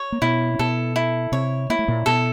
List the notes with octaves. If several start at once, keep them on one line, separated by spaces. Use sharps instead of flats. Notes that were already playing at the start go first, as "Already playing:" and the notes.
Already playing: C#5
A#3
B2 B3 E4
C4
B2 B3 A4
E4
C3 C4 C#5
A#3 E4
A3
A#2 A#3
B2 B3 A4